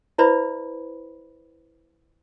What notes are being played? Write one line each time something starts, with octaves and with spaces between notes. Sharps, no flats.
E4 B4 C5 D5 E5 B5